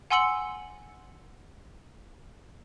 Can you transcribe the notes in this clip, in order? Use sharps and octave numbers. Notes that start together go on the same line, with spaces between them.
F#5 G#5 C6 E6 C#7 F#7